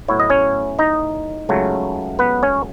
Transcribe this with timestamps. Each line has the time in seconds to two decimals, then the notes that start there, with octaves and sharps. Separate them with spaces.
0.08 A2 F#3 B3 E4 C#5
0.20 D#5
0.30 C#4 C#5
0.79 D#4 D#5
1.49 C#2 C#3 F#3 A3
2.19 B3 B4
2.43 C#4 C#5